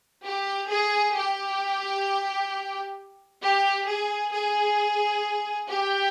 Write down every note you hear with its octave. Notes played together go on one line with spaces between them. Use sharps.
G4
G#4
G4
G4
G#4
G#4
G4